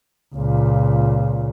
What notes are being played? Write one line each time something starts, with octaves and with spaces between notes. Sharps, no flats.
C#2 A#2